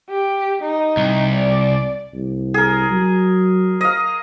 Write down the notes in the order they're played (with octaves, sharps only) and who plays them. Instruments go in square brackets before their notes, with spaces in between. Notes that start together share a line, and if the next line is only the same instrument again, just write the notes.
[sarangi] G4
D#4
[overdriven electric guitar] C2
[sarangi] D5
[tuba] C2
[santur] G#4 A#4
[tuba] F#3
[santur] D#5 F5